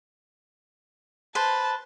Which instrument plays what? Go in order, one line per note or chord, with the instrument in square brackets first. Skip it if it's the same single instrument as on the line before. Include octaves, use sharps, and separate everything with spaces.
[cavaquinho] B4 C5 [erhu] A5